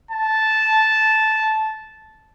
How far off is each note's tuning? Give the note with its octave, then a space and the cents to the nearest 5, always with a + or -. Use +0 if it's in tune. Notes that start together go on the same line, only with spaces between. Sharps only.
A5 -10